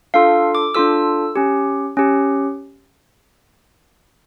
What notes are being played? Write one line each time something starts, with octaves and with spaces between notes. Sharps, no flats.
D4 F4 A4 F5
D6
D4 F4 A4 E6
C#4 G4
C#4 G4